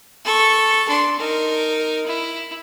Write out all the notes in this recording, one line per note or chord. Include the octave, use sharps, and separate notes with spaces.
A4 C#6
D4 C6
D#4 A#4
E4